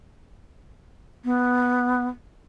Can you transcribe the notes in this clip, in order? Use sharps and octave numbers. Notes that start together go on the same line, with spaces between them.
B3